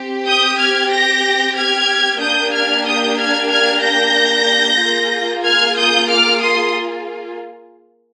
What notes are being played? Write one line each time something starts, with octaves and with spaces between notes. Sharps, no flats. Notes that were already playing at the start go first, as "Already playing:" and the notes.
Already playing: C4 G4
D#6 G6
F6 G#6
G6 A#6
F6 G#6
A#3 D4 G4 D#6 G6
F6 G#6
D#6 G6
F6 G#6
F6 G#6
G6 A#6
A#3 F4 G#4
F6 G#6
D#6 G6
D6 F6
C6 D#6